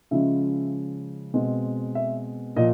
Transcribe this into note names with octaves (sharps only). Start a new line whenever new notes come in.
C#3 F3 G#3 C#4 E5
B2 G#3 C4
E5
A#2 F3 D#5